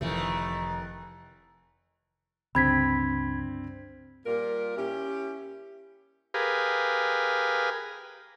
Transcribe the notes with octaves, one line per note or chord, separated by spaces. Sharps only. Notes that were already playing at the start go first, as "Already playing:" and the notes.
F1 D#3 E3 A3
C#2 G2 D3 C4 B5 G#6 B6
A#2 G3 F4 A#4
C#4 E4 G4
G4 G#4 A#4 B4 F5